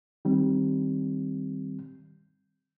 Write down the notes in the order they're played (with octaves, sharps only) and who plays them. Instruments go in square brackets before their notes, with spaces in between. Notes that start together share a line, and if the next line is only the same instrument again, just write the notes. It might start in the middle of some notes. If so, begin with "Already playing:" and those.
[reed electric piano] D#3 G3 C4